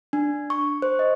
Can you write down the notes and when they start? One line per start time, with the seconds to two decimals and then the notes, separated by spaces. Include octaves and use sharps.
0.13 D4
0.50 C#6
0.82 C5
0.99 D#5